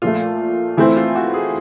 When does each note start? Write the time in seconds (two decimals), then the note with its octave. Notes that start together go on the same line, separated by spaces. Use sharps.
0.02 A#2 F3 A3 F4
0.77 E3 A3 C4 E4
0.96 F4
1.15 F#4
1.34 G#4